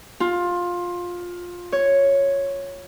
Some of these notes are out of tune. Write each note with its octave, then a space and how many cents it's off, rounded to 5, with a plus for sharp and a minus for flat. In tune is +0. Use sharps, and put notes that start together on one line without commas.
F4 +15
C#5 +0